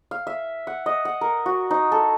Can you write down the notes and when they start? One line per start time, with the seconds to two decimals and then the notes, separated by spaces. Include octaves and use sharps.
0.11 F5
0.27 E5
0.67 F#5
0.86 D#5
1.05 F#5
1.21 A#4
1.46 F#4
1.71 D#4
1.92 A4